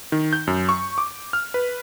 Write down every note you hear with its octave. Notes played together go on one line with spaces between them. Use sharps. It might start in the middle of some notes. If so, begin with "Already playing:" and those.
D#3
G6
F#2
C#6
D6
F6
B4